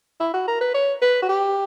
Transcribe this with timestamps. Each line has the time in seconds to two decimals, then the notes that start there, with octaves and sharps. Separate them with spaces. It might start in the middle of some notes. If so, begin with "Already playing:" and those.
0.20 E4
0.34 F#4
0.48 A#4
0.61 B4
0.74 C#5
1.02 B4
1.22 F#4
1.29 G4